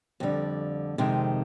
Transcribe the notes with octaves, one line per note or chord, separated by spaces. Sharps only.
F2 D3 G3
F2 C3 D#3 G#3